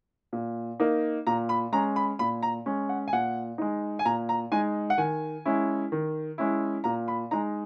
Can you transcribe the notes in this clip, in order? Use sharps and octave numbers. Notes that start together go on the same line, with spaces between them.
A#2
A#3 D#4
A#2 A#5
B5
G#3 C#4 A#5
B5
A#2 B5
A#5
G#3 C#4
F#5
G#5
A#2 F#5
G#3 D#4
G#5
A#2 A#5
A#5
G#3 D#4 G#5
F#5
D#3 G#5
G#3 C#4 E4
D#3
G#3 C#4 E4
A#2 A#5
B5
G#3 D#4 A#5